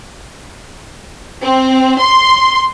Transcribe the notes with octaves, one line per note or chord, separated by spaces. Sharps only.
C4
C6